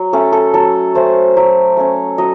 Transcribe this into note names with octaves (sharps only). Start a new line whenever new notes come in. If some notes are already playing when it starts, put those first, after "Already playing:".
Already playing: F#3
A3 C#4 A4
A4
F#3 A4
A3 C#4 C5
F#3
A3 C#4
F#3 D#5